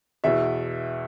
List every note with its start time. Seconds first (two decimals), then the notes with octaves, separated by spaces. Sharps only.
0.24 E2 B2 E5